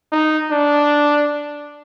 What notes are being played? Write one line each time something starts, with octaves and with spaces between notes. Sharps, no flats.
D#4
D4